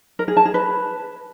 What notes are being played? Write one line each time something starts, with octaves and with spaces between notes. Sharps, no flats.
A#4
G#4
A5
G#4
B4